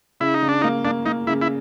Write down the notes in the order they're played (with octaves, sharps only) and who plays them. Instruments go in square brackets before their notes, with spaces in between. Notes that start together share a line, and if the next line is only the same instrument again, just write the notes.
[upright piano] C#3 [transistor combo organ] E4
[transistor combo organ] D#4
[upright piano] C#3
[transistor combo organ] D4
[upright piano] A#3 [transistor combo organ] D#4
[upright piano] A#3 [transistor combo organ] D4
[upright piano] A#3 [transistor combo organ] D#4
[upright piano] C#3 [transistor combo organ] E4
[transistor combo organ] E4